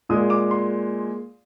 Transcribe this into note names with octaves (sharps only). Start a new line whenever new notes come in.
A#2 G#3 D#6
D6
C6